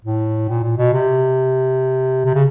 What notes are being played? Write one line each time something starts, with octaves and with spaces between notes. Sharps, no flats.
A2
A#2
A#2
B2
C3
C3
C#3